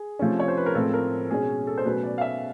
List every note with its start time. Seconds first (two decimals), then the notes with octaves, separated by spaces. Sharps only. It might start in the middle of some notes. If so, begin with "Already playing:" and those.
Already playing: G#4
0.19 C3 F3 A3 C#4
0.39 C#5
0.48 C5
0.57 B4
0.66 A#4
0.74 A2 F3 G#3 C4 A4
0.94 A#4
1.30 B2 G#3 C#4 G#4
1.67 A4
1.77 C5
1.85 B2 F#3 A3 C#4 B4
2.03 D5
2.18 F5
2.21 E5